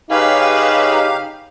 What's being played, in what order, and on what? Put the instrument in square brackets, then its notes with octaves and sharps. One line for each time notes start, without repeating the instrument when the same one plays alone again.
[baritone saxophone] C#3 [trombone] D#4 [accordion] G4 F5 [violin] B4 C#5